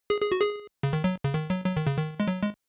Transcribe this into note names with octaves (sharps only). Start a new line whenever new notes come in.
G#4
G#4
F#4
G#4
C#3
D#3
F#3
C#3
D#3
F#3
F#3
D#3
C#3
D#3
G#3
F#3
G#3